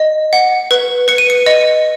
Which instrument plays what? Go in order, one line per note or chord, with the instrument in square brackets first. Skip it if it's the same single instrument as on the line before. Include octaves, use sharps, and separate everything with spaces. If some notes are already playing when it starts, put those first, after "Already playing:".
Already playing: [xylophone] D#5
F#5
B4
B4 C#7
D#7
C#7
D#5